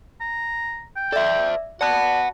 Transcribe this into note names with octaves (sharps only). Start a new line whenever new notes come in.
A#5
G5
A4 C5 D5 E5
F#4 D5 F#5 A5 B5 F#6